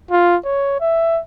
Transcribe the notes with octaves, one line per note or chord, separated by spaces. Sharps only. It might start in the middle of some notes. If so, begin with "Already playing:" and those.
F4
C#5
E5